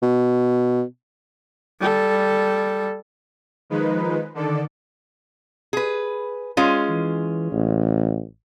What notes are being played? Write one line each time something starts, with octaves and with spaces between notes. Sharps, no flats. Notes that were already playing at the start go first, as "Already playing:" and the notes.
B2
G3 A4
D#3 F3 G#3 D#4 B4
D3 D#3 A4 D5
G#4 B4
G#3 C#4 F4
E3
A1